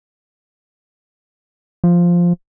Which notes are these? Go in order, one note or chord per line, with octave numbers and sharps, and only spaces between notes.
F3